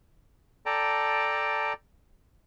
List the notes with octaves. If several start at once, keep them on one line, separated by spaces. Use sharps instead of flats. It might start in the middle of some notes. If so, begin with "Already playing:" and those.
A4 D5 G5 A5 A#5